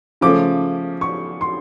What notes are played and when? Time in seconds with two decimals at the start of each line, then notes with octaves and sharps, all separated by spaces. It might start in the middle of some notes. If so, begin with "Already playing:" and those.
0.21 C#3 F3 A3 C#4 D6
1.01 C#6
1.41 C6